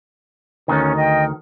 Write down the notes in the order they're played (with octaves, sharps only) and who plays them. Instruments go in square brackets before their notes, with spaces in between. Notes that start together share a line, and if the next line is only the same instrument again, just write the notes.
[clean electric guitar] D2 D#3 [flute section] C#4
[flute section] D#5 G5